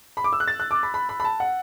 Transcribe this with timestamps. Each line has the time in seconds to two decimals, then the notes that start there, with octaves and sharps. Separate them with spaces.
0.17 B5
0.24 D6
0.33 E6
0.40 F#6
0.48 A6
0.60 F#6
0.71 D6
0.83 B5
0.94 B5
1.09 B5
1.20 B5
1.24 A5
1.40 F#5